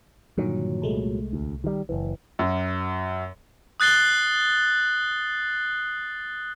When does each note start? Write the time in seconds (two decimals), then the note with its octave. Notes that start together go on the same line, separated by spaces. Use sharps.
0.38 G2 A#2 D3 D#3 F#3
0.82 C2 G#3 A3
1.33 D2
1.64 D#3 G3
1.89 F#1 B1 E3
2.39 F#2
3.80 D#6 F#6 A6 C7 G7